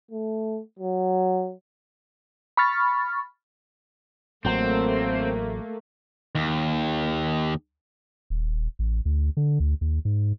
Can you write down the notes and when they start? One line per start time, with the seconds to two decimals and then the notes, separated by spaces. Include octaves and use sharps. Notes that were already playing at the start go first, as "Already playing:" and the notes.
0.11 A3
0.79 F#3
2.57 B5 C#6 F6 A6
4.45 A1 F#3 A3 A#3 C4
6.35 D#2
8.30 D#1
8.79 A1
9.05 D2
9.37 D3
9.60 D2
9.81 D#2
10.05 G#2